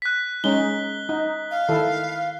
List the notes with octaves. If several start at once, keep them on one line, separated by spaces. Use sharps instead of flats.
F#6 B6
G#3 C#4 D#4 G7
D#4
F5
D#3 E4 A4